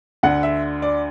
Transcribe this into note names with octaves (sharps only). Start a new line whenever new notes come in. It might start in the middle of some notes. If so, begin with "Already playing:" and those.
D2 D3 F#5
E5
D5